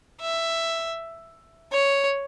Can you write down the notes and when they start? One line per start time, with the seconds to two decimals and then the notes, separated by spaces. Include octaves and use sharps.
0.21 E5
1.72 C#5